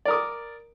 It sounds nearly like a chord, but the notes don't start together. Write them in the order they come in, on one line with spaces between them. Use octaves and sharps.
D5 A#4 D#6 D6